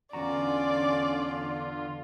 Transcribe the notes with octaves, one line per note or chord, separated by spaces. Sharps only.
E2 D3 C#4 F4 F#4 D5 A#5